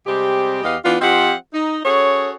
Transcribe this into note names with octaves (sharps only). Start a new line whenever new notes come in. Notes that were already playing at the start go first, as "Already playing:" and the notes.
C3 G3 G#3 C4 G4
E2 B3 G4 D#5 F5
E3 B3 D4 F4
F3 C4 F4 G4 D#5 F#5
D#4
C#4 F#4 G#4 A4 C#5